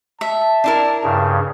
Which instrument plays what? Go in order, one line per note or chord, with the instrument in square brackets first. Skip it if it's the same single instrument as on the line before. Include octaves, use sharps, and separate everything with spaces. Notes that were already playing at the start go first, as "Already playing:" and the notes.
[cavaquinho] E5 [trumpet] A5
[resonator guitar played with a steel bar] D4 E4 A#4
[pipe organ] G2 C#3